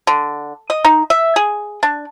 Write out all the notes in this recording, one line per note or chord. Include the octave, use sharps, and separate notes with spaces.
D3
D#5
D#4
E5
G#4
D4